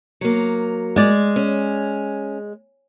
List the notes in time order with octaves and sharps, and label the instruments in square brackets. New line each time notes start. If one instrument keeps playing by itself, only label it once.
[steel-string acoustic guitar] F#3 A#3
[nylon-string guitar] G#3 D5
[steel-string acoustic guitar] C#4